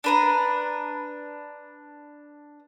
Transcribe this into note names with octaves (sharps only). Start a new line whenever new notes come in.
D4 B4 A#5